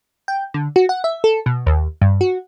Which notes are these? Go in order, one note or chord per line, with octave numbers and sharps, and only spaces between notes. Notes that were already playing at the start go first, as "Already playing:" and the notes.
G5
D3
F#4
F#5
E5
A4
B2
D#2
G2
F#4